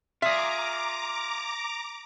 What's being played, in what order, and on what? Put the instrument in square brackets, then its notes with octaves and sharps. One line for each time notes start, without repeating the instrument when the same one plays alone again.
[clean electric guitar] F4 G#4 [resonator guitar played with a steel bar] E5 [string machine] A#5 D6